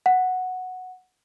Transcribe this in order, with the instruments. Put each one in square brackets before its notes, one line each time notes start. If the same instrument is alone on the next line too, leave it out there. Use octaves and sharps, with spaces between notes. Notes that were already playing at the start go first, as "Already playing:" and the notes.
[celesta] F#5